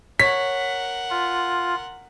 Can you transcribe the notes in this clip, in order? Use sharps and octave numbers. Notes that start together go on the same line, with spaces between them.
A#4 C#5 F#5 B6
F4